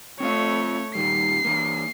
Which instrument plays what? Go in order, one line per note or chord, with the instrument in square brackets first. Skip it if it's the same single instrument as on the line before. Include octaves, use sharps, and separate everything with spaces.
[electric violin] A3 C#5 [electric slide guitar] C4 F4 F5
[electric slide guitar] A#2 D#3 G3 [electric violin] C7
[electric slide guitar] E3 A#3